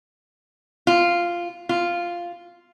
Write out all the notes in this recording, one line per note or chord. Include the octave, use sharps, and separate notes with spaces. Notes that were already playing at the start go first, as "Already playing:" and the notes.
F4
F4